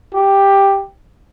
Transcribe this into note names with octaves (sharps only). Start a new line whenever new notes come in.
G4